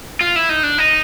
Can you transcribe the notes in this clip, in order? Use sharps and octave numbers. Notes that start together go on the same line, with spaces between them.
F4
E4
D#4
D4
D#4